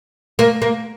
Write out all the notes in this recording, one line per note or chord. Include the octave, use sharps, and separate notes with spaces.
A#3
A#3